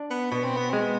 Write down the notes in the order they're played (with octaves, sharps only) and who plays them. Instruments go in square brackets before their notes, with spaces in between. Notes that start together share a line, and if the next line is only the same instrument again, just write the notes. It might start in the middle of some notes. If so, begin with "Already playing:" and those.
Already playing: [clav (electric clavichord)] D4
[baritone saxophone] B3
[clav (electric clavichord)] B2 [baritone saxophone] B3
[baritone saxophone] C4
B3
[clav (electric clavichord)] G#3 [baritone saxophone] C4
[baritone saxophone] B3